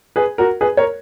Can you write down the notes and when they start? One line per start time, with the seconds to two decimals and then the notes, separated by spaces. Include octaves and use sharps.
0.16 G#4 B4
0.38 F#4 A#4
0.61 G#4 B4
0.77 A#4 C#5